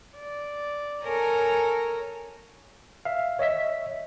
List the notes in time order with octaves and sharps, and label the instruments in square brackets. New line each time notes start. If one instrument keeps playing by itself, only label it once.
[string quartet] D5
A4 A#4 C#5 G#5 A#5
[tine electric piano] E5 F5
C#5 D#5 E5 B6